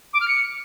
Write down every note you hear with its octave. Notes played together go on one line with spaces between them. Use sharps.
D6
F6
C#7